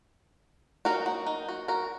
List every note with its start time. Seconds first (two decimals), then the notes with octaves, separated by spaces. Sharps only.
0.85 F#3 A#3 D#4 F#4 A#4
1.06 F#4
1.26 D#4
1.48 F#4
1.68 F#4 A#4